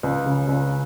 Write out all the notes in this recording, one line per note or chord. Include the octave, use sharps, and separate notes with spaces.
C#2
C#3
C#2